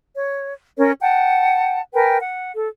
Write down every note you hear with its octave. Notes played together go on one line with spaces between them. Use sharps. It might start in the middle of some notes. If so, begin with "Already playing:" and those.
C#5
C#4 A#4 C#5
F#5 G5 A5
A#4 B4 G5 G#5
F#5
A4